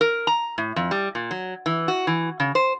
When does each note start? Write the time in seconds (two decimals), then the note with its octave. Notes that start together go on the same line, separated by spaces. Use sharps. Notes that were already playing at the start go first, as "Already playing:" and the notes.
0.01 A#4
0.27 A#5
0.58 A2
0.76 F2
0.91 G3
1.15 A#2
1.31 F#3
1.66 E3
1.88 F#4
2.07 E3
2.40 C#3
2.55 C5